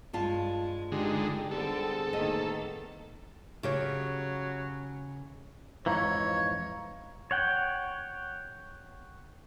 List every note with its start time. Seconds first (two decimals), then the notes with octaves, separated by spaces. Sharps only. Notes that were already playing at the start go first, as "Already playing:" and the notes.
0.13 G2 G#3 F4 A5
0.92 D3 G#3 D#4 G4
1.51 D3 G3 B3 C4 G#4 A4
2.13 A2 D#3 A#3 D#5
3.63 C#3 F#3 G4 C#5
5.86 F2 G#2 E3 C#5 F5 A#5
7.31 C#5 F#5 G5